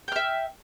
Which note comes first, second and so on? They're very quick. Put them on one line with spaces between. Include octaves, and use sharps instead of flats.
G5 F6 E5